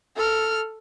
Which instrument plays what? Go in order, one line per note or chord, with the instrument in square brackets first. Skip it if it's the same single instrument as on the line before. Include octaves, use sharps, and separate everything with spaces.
[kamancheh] A4 F6